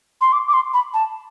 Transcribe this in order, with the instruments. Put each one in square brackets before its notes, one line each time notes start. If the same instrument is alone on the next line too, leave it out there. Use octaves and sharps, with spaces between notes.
[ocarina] C6
D6
D6
C6
B5
A5